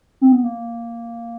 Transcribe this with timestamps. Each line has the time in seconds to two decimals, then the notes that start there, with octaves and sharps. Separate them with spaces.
0.21 C4
0.32 B3
0.44 A#3